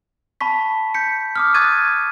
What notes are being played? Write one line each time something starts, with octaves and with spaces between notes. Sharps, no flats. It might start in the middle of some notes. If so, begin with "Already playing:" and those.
A5 B5 C#6 B6
G6 B6 C#7
D6 D#6 F6
C#6 D#6 F#6 G#6 A6 D#7